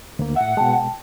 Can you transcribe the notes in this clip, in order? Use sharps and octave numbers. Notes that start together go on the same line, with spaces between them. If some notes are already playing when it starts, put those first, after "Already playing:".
D2 A#3
A2 E5 F#5
B2 G#3 G5 A5